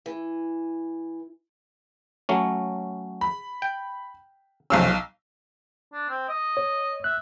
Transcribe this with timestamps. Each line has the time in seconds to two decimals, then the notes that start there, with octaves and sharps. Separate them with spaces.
0.06 E3
2.29 F#3 A3 C#4
3.21 B5
3.62 G5
4.70 B1 F2 C3 C#4 F5 E6
5.94 D4
6.09 C4
6.29 D#5
6.57 C#5
7.04 E5 F#6